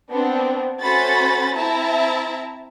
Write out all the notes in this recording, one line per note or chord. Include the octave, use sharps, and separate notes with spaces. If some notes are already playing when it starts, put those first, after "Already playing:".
B3 C4 D4
A3 C#4 F#4 C5 B5 A6
C4 E4 E5 A5 A#5